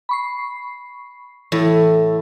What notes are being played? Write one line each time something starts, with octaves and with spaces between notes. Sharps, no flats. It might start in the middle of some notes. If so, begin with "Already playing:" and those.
B5 C#6 C7
A2 E3 E4